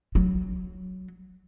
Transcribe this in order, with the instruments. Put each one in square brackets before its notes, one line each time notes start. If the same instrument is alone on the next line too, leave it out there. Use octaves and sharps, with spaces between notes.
[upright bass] F#3